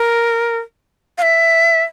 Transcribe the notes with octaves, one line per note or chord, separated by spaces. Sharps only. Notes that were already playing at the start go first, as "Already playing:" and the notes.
Already playing: A#4
F5
E5